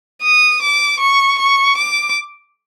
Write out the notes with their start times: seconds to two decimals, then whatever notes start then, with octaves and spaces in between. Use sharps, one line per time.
0.22 D#6
0.62 D6
1.00 C#6
1.39 C#6
1.78 D6